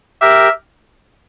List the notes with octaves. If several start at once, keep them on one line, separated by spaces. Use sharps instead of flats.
G4 A#4 E5